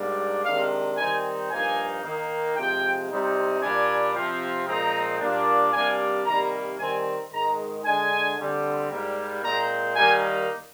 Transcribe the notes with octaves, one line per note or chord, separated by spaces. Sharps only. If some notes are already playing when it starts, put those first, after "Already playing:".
Already playing: G#2 G3 A#3 D4
C3 D#3 G#3 D4 F5
D#3 G3 C4 D#4 G#5
G2 F3 A#3 D#4 G#5
D#3 A#3 D#4
C3 F3 G#3 G5
C3 G3 C4 D#4
A#2 G3 D4 G#5
C3 F3 C4
A#2 F3 G#3 C4 D#4 A#5
A#2 G3 A#3 D4
C3 G3 A#3 D4 G#5
C3 D#3 G3 A#3 A#5
D#3 G3 C4 G#5
G#2 D#3 G#3 A#5
D3 G#3 D4 G#5
D3 G3 C4
G#2 G3 A#3
A#2 G#3 C4 A#5
D#3 G3 A#3 D#4 G#5